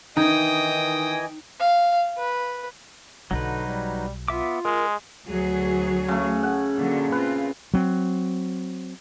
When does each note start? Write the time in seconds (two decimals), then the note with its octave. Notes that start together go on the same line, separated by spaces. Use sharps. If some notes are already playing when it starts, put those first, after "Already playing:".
0.17 D#3 E3 D#4 D#5 G5 G#5 D#6
1.60 F5
2.18 B4
3.31 B1 D3 F#3 D#4 B4
3.66 G3
4.28 B3 F4 E5 D6
4.65 G#3 A#4
5.27 D2 F#3 G#4
6.08 C#3 A3
6.43 F#5
6.75 A#2 D3 F#3
7.12 C4 F4 B4
7.74 F#3 C4